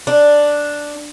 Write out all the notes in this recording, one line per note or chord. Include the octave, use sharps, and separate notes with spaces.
D4